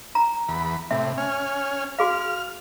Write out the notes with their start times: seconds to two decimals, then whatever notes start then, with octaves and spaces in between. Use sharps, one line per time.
0.15 A#5
0.49 E2 B5
0.91 A2 C3 E5
1.18 C#4 G#5 F6
1.99 F#4 G#4 F5 F6